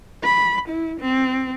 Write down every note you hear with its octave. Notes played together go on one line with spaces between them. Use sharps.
B5
E4
C4